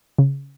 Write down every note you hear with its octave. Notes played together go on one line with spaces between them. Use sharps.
C#3